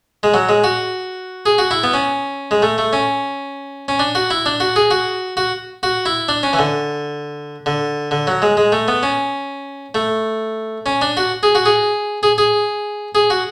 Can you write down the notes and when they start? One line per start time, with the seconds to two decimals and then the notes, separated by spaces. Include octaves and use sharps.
0.23 G#3
0.34 F#3
0.49 G#3
0.64 F#4
1.46 G#4
1.58 F#4
1.71 E4
1.83 B3
1.94 C#4
2.51 G#3
2.62 A3
2.78 A3
2.93 C#4
3.88 C#4
3.99 D4
4.15 F#4
4.31 E4
4.46 D4
4.60 F#4
4.76 G#4
4.91 F#4
5.37 F#4
5.83 F#4
6.06 E4
6.29 D4
6.43 C#4
6.53 E3
6.59 D3
7.66 D3
8.11 D3
8.27 F#3
8.42 G#3
8.57 G#3
8.72 A3
8.88 B3
9.03 C#4
9.95 A3
10.86 C#4
11.02 D4
11.17 F#4
11.43 G#4
11.55 F#4
11.66 G#4
12.23 G#4
12.38 G#4
13.15 G#4
13.30 F#4